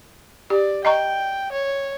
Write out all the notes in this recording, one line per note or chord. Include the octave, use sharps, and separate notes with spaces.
G4 D5
D#5 G5 A#5 C#6
C#5